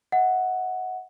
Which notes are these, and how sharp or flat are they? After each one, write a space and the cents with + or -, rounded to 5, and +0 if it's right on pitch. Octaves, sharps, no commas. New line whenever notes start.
D#5 +45 F#5 +0